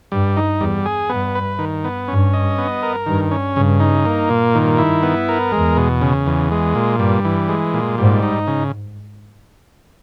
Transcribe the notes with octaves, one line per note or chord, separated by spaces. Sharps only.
G2 G3
D#4
E2 G3
G#4
G2 B3
B4
D#3
B3
G2 C#4
D#5
B3
A#4
G2 D#3
C#4
G2 C#3
D#4
A#3
A#2
G2 D#3
E4
B3
A#4
E2 G#3
B2
C#3
E2
G#3
A#2
G2 G3
E3
G#3
A#2
G#2 G3
D#4
C#3